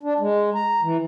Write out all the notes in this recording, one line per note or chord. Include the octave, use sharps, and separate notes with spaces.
D4
G#3
A#5
E3